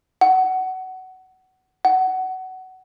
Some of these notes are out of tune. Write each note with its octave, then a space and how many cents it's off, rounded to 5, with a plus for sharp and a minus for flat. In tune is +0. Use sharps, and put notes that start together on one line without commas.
F#5 +20
F#5 +20